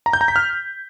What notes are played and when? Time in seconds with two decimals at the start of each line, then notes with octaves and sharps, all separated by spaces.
0.06 A#5
0.13 G6
0.21 A#5
0.28 B6
0.36 F6